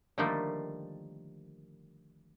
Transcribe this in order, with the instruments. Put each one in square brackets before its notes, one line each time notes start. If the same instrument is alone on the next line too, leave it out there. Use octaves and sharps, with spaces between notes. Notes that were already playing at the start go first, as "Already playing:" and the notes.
[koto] D3 D#3 F3 G3 A3 A#3